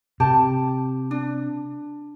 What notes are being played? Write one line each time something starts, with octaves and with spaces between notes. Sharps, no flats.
C3 G4 A5
D4